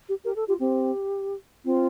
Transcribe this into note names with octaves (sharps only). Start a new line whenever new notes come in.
G4
G4 A#4
A4
F4 G4
C4 G4
C4 F4